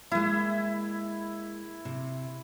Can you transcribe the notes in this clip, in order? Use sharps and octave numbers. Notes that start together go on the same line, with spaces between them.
G#3 A#3 E4
C3